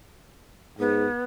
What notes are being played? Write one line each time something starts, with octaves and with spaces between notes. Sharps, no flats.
G#2 B3